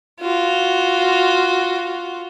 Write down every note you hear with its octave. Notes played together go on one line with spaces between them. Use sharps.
F4 F#4